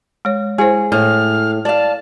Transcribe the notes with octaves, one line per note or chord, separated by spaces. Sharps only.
G#3 C#5
G#3 E4 G#4 C5
A2 A3 F6
D5 F5 A5